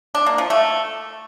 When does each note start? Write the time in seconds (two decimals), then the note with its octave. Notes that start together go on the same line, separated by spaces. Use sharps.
0.15 D4
0.26 A#3
0.38 F3
0.50 A3